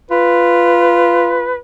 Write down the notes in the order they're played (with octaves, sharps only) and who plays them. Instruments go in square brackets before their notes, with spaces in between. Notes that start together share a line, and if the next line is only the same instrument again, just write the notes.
[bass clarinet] F4 [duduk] B4